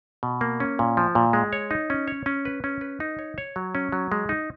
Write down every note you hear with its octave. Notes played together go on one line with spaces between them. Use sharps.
B2
A#3
C#4
A#2
F3
A#2
G#3
C#5
D#4
C#4
C#5
C#4
B4
C#4
B4
D#4
C#5
C#5
F#3
C#4
F#3
G#3
D#4